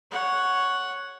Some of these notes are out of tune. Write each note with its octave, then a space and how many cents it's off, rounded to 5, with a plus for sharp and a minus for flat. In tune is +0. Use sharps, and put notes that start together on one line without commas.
C#5 +0 F#5 +0